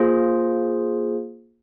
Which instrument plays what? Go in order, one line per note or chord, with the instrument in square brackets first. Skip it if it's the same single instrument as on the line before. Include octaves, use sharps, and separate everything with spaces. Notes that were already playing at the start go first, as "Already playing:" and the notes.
Already playing: [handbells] A#3 F4 G#4 C5